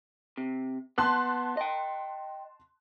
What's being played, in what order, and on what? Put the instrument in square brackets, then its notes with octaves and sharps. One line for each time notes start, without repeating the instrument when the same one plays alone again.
[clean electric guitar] C3
[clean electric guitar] B3 [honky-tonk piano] A5 C6 F#6
[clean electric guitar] D#5 G5